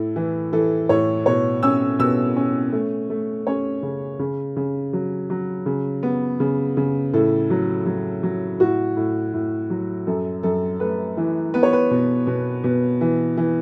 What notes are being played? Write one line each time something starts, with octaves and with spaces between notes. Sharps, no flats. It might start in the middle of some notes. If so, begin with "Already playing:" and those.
Already playing: A2 A4
E3
E3 A4
A2 C#5
B2 C#5
C#4 E6
B2 E6
C#4
A3
A3
C#4 C#5
C#3
C#3
C#3
F#3
F#3
C#3
B3
C#3
C#3
A2 A4
F#3
F#3
F#3
A2 F#4
A2
A2
F#3
F#2 A4
F#2 A4
A3 B4
E3
B3 B4
C#5
B4
B2
B2
B2
E3
E3